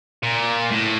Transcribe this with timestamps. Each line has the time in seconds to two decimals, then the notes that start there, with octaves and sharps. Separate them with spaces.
0.23 A#2
0.71 A2